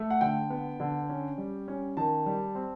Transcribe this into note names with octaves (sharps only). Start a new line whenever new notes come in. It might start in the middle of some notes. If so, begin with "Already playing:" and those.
Already playing: A3
F#5
D3 G5
B3
D3
C#4
G3
C#4
D#3 A5
G3
C4